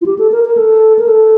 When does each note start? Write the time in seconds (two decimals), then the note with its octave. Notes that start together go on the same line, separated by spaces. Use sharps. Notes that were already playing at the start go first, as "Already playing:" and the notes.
0.01 F4
0.06 G4
0.18 A4
0.32 A#4
0.45 A#4
0.57 A4
0.99 A#4
1.08 A4